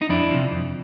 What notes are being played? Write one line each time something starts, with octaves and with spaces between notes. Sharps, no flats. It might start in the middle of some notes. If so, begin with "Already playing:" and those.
D#4
F2 D4 E4
C3 F3
F2